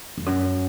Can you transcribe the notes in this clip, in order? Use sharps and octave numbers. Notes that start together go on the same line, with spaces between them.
F2
F#2